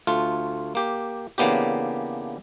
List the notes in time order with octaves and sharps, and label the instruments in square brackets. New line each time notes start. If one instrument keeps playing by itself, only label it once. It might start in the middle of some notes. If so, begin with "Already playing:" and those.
[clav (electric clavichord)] D2 A3 F4
A#3 G4
C#3 E3 A#3 B3 D4 G4